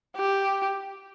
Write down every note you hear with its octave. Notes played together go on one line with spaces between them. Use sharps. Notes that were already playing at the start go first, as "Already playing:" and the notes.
G4